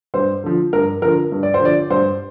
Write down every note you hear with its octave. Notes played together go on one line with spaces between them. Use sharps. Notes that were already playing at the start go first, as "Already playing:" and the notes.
G2 C5
D3 F3
G2 A#4
D3 F3 A#4
G2
D5
C5
D3 F3 D5
G2 C5